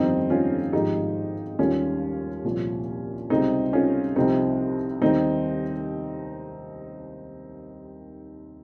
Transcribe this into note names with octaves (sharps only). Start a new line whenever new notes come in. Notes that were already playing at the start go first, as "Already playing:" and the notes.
Already playing: G1 F2 D#3 G3 C4 D#4
C#4 F4
G#1 G#2 F3 D#4 G4
D#2 D#3 G3 C#4 F4
C2 A#2 F3
C#2 C3 G3 C4 D#4
C#4 F4
C2 C3 F3 C4 D#4
D#2 D#3 G3 C4 D#4